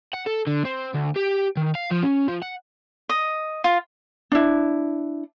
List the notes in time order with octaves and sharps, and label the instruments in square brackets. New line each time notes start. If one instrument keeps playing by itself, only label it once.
[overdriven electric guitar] F#5
A4
D3
C4
D2
G4
D#3
F5
F3
C#4
F3
F#5
[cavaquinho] D#5
F4
[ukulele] D4 E4